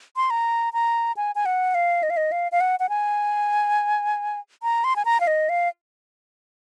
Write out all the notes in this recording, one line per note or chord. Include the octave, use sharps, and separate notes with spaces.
C6
A#5
A#5
G#5
G#5
F#5
F5
D#5
F5
D#5
F5
F5
F#5
F#5
G#5
A#5
C6
G#5
A#5
F5
D#5
F5